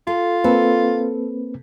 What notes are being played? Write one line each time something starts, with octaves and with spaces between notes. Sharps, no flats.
F4 A4
A#3 C4 A4 B4